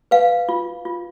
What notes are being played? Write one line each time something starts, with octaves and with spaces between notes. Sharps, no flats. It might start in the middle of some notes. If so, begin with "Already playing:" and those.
B4 F5
F4
F4